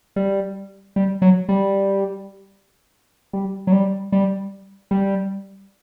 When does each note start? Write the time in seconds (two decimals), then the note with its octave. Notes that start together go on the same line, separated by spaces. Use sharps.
0.16 G3
0.96 G3
1.22 F#3
1.49 G3
3.33 G3
3.67 F#3
3.72 G3
4.12 G3
4.91 G3